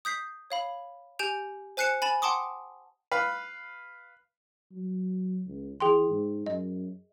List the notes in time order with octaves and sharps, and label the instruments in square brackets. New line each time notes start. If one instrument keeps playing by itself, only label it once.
[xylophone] D#6 G6 B6 C7
C#5 F5 B5
G4 G#5 G6 D7 E7 F7
C5 G#5 F#6 C7 C#7 E7
G#5 B5 A6 E7
F#5 G5 A5 C6 D6 D#6
[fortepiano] B4 F5
[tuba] F#3
C#2
[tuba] E3 [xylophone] G#4 G5 C6
[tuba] G#2
[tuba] F#2 [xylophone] D#5